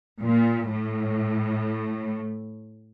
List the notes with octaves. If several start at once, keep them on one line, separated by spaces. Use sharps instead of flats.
A#2
A2